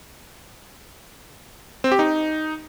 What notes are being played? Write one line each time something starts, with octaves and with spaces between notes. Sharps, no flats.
C4
G4
D#4